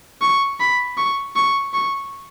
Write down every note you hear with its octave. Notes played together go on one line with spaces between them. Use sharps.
C#6
B5
C#6
C#6
C#6